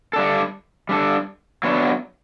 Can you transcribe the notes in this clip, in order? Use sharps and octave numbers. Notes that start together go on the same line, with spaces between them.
G3 D4 A4
G3 D4 A4
F#3 B3 D4